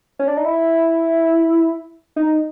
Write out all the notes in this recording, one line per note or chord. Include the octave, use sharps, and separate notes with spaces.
C#4
D4
D#4
E4
D#4